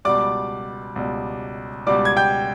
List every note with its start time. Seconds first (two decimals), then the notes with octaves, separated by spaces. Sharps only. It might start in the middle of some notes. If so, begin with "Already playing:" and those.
0.05 C#2 B2 G3 D5 D6
0.96 C#2 B2 G3
1.86 C#2 B2 G3 D5 D6
2.05 G#6
2.17 G5 G6